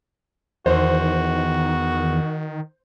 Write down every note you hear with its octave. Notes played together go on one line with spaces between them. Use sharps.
E2 D#3 F#4 C5